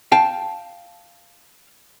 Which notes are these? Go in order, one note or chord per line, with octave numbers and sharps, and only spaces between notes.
F5 G5 A5